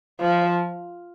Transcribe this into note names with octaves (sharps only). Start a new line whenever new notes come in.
F3